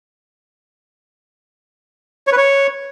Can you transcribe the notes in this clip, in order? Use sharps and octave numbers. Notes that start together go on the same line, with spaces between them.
C#5
B4
C#5